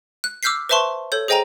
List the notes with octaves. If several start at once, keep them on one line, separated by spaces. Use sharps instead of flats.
F#6
D6 E6 F6 G6 B6 C7
B4 C5 E5 A5 C6 C#6
A4 C#5 G6
G#4 C5 D#5 G5 G#5 A#5